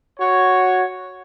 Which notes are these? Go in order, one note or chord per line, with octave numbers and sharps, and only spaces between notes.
F#4 C#5